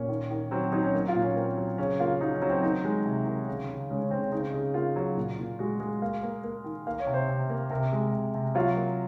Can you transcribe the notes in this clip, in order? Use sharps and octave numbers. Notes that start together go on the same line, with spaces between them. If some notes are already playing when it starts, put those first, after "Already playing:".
Already playing: A#2 C#4
D#3
D#3
F#3 C4
F#3 D#4
C#4
A#3
F4
A#2
C#4
A#3 C4
F#3
C#3 C#4
A#3 F4
F#3 D#4
C#4
F#3
C4
D#3 D#4
G#3
C3
D#3
C#3
C#3
G#3 C#4
C#4
C#3 C4
C#4
C#3 D#4
C#3
A#3 F4
F#3
A#2
A#2
G#3 F#4
G#3
A#3 F5
A#3
A#3
D#3
A#3 F5
C#5
C3
C5
C3
A#3
C3 A#4
G#3
C3
C3
F#3 F4
A#3